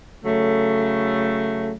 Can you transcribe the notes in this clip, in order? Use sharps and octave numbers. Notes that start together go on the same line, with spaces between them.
C#3 F#3 A3